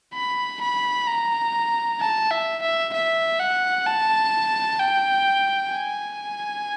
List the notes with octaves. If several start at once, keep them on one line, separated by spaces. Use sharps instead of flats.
B5
B5
A#5
A5
E5
E5
E5
F#5
A5
G5
G#5